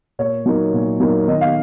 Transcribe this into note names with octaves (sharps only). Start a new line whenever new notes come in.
A#2 C#5
F#3 A#3 D#4
A#2
F#3 A#3 D#4
D#3 D#5
F5